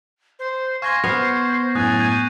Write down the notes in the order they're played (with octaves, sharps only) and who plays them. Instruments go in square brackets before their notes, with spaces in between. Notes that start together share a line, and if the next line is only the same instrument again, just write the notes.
[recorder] C5
[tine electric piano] F5 C6 [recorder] G#5 [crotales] C#6 G#6 A#6
[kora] B3 [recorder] C5 [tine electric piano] C#6 F6 [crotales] C7
[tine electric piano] F#2 A2 [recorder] G#5 [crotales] D#6 F#6 A6
[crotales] D#6 G6 D#7